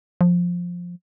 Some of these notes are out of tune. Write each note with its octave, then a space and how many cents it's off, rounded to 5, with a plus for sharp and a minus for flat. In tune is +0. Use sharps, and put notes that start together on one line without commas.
F3 +10